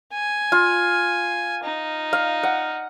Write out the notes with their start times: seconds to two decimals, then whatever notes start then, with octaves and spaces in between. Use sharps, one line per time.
0.14 G#5
0.52 F4
1.64 D#4
2.13 F5
2.43 F#5